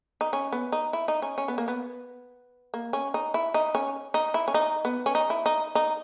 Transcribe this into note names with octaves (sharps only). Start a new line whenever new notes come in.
D#4
C#4
B3
D#4
E4
D#4
C#4
C#4
B3
A#3
B3
A#3
C#4
D#4
E4
D#4
C#4
D#4
E4
C#4
D#4
B3
C#4
D#4
E4
D#4
D#4